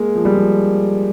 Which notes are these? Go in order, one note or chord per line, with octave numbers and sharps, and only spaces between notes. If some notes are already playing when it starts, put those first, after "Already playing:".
Already playing: G#3 A#3
F3
G3
F3